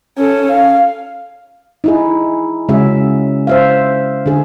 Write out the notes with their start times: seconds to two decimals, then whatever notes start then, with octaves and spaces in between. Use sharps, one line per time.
0.18 C#4 A4
0.50 F5
1.84 D#4 E4 G#4
2.69 C#3 G#3 C#4 F#4 G#4 E5
3.47 C5 E5 F5
4.26 D3 G#4